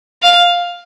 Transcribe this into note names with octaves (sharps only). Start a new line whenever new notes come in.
F5